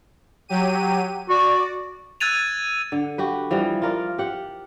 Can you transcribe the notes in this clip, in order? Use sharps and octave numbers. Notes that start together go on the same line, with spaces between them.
F#3 G4 D#7
F#4 D5
E6 F#6 G#6 A6 D#7 F7
D3
F#4 G4 B4
E3 F3 G3
F4 A#4 D5
G4 F#5